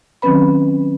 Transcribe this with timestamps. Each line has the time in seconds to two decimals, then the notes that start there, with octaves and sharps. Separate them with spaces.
0.22 D#3 F#3 C4 C#4 B4 B5